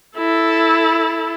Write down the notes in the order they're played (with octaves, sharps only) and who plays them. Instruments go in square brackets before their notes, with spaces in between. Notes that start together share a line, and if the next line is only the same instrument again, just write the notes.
[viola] E4 A4